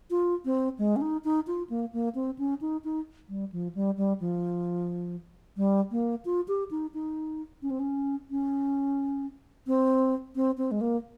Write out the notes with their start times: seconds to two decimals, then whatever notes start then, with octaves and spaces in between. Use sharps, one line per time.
0.11 F4
0.45 C4
0.78 G#3
0.96 C#4
1.01 D#4
1.24 D#4
1.47 F4
1.70 A#3
1.93 A#3
2.15 C4
2.39 C#4
2.61 D#4
2.84 D#4
3.29 G3
3.52 F3
3.75 G3
3.97 G3
4.20 F3
5.57 G3
5.91 A#3
6.25 F4
6.48 G4
6.71 D#4
6.94 D#4
7.62 C#4
7.71 C4
7.80 C#4
8.31 C#4
9.67 C4
10.35 C4
10.58 C4
10.71 G#3
10.81 A#3